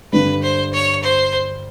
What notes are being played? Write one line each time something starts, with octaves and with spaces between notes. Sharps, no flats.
G2 D3 G3 B4
C5
C#5
C5